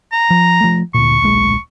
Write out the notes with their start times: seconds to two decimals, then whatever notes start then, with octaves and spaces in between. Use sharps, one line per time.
0.12 A#5
0.30 F3
0.61 F3 A3
0.94 D2 A#2 C#6
1.22 D1 A#1 G#3